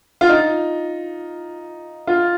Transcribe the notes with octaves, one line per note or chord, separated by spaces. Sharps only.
F4
D#4
F4